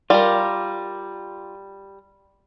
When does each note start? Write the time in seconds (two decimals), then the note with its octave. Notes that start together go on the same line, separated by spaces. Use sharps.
0.10 G3 F4 G4 A#4